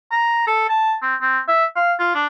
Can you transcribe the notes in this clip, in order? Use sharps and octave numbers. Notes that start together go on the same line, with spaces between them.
A#5
A4
A5
C4
C4
E5
F5
F4
D4